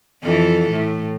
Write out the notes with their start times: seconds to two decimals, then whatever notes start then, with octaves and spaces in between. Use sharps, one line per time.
0.22 F2 E3 A4
0.70 A2